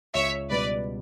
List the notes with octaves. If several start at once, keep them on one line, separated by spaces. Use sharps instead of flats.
C#2 C#5 E5
B2 G3 B4 D5